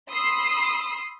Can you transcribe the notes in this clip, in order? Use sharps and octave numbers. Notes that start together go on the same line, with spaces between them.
B5 C6 D#6 E6 C7